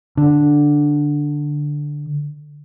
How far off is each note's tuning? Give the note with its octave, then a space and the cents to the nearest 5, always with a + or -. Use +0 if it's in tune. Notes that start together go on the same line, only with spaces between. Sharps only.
D3 +0 D4 +0